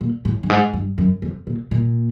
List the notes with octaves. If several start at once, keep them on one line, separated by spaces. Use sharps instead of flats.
A#2
A2
G2
G#2
G2
F#2
F2
A#2
A#2